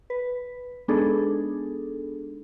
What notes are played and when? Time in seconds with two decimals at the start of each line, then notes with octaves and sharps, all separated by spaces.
0.10 B4
0.88 G#3 B3 D4 D#4 G#4 A4